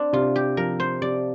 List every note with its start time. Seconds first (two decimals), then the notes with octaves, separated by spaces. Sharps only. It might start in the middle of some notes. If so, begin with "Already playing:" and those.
Already playing: C4 D4
0.13 C3 F4
0.36 G4
0.57 F3 A#4
0.80 C5
1.01 C3 D5